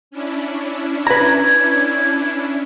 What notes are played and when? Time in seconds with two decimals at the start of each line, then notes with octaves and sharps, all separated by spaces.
0.11 C#4 D4 E4
1.07 B4 A#5 G#6